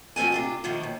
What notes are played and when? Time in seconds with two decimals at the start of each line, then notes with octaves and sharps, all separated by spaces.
0.16 F3 A3 C4 F#4 G#5
0.32 C3 D4 F4
0.64 G#2 B2 D3 D#3 F3 A3
0.83 D#2